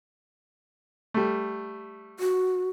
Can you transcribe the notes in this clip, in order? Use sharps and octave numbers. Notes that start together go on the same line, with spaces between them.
G3 A3
F#4